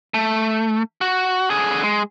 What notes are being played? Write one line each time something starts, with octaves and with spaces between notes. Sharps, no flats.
A3
F#4
D3 G#4
G#3